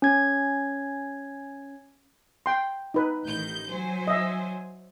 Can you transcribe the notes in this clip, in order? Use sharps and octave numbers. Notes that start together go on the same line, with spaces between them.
C#4 G#6
G5 C6
D#4 B4
A1 D#3 G6
F#3 C5 G#5
D#5 E5